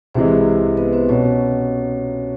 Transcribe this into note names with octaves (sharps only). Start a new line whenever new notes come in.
C2 C3 E3 G#3 C4 C5
B3 B4
C4 C5
B2 C#4 C#5